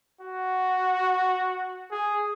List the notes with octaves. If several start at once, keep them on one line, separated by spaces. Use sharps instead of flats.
F#4
G#4